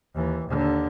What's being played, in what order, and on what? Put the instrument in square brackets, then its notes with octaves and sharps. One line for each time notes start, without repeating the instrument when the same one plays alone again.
[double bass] D#2 E3
D#2 D3